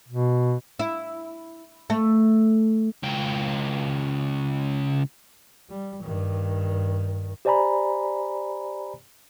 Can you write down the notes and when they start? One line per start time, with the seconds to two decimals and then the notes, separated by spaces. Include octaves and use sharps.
0.09 B2
0.79 E4
1.90 A3
3.04 C#2 G5
5.70 G3
6.02 G2 D#3
7.45 G4 C5 D5 G#5 A#5 B5